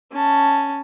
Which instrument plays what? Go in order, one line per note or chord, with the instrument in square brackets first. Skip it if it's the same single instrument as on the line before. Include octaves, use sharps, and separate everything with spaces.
[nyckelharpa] C#4 A5